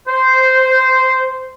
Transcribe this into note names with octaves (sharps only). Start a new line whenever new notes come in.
C5